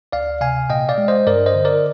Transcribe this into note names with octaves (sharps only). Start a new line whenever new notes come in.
D2 D5 F5
C3 F5 G#5
A#2 D#5 G5
D5 F5
G#3
C5 D#5
G2 A#4 D5
C5 D#5
D3
A#4 D5